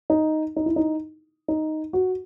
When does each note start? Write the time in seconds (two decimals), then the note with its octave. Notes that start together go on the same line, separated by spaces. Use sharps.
0.10 D#4
0.56 D#4
0.66 E4
0.76 D#4
1.48 D#4
1.93 F#4